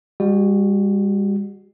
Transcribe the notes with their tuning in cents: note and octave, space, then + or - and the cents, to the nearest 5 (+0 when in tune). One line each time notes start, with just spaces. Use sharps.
G3 +40 F#4 +0